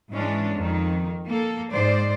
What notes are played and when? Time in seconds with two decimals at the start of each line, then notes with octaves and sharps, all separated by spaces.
0.10 G#2 E3 G#3 C#4 D4
0.55 F2 D#3
1.26 A#3 A4
1.72 G#2 C5 D5